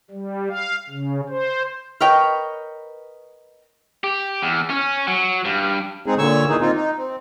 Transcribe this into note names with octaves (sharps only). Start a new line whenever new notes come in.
G3
F5
C#3
C5
A#4 B4 C#5 D#5 G5
G4
E2
C#4
F#3
G2
G#3 C4 D#4 G#4
A#2 D3 C#5 C#6 E6
A#2 D#3 E3 D#4 G#4
A#3 C4 D#4 F4
D#4
C4